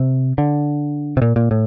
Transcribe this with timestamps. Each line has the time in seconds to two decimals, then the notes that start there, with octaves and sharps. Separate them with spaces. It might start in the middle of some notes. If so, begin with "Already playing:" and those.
Already playing: C3
0.38 D3
1.17 C3
1.22 A#2
1.36 A#2
1.51 A2